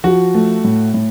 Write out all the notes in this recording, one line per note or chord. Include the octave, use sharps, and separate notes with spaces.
F3 F#4
A3
A2
A2